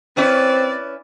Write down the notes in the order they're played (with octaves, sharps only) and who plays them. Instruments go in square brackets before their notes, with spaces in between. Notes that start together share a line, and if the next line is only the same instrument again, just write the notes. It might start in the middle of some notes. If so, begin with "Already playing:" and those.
[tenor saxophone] C4 [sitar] C#4 E4 B4 [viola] D5